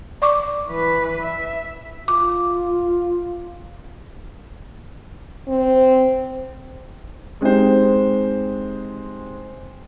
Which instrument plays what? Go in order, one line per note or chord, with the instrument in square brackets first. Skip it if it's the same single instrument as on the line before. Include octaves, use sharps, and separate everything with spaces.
[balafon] D5 C#6 D6
[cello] E3 B4
E5
[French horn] F4 [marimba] D6
[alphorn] C4
[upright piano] G#3 C4 D#4 G4 C5